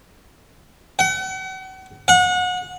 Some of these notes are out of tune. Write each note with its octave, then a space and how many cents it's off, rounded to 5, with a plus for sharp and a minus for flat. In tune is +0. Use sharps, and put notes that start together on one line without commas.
F#5 +40
F#5 -30